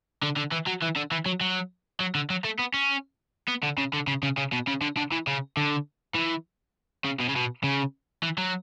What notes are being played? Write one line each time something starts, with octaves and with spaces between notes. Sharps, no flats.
D3
D3
E3
F#3
E3
D3
E3
F#3
F#3
F#3
D3
F#3
A3
B3
C#4
B3
D3
C#3
D3
C#3
C#3
C#3
B2
C#3
D3
D3
E3
C#3
D3
E3
C#3
B2
C#3
B2
C#3
E3
F#3